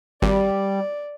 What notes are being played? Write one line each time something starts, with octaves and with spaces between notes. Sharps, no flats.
G#1 G3 D5